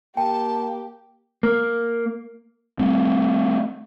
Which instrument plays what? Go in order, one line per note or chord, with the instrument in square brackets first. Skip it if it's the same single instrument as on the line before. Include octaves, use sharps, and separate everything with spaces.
[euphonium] A#3 [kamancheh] G4 [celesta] G5 [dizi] A5
[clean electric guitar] A#3
[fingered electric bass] G3 A3 C4